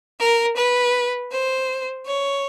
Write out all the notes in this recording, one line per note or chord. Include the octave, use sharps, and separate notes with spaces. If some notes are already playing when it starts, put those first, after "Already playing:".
A#4
B4
C5
C#5